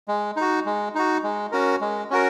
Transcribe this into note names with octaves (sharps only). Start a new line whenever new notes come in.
G#3
D#4 F#4
G#3
D#4 F#4
G#3
C#4 F#4 A#4
G#3
C#4 F#4 A#4